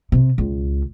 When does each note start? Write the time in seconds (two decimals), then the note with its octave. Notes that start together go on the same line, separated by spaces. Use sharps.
0.12 C3
0.38 C#2